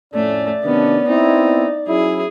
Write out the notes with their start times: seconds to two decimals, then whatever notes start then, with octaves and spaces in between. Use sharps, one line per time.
0.14 F2 A2 A3 C#4 D5
0.64 C3 D#3 B3 C#4 D4
1.08 B3 C4 D#4 E4
1.88 F#3 C#4 E4 G#4